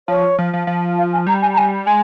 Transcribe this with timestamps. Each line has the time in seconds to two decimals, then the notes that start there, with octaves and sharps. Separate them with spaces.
0.08 F3 C#5
0.38 F3
0.53 F3
0.67 F3
0.98 F5
1.12 G#5
1.27 G3 A#5
1.42 G#5
1.53 A#5
1.57 G#5
1.87 G#3 G#5